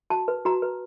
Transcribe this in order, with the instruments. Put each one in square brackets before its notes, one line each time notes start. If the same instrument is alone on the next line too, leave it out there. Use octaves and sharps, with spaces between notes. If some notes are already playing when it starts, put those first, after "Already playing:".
[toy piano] F#4 A5
B4
F#4 A#5
B4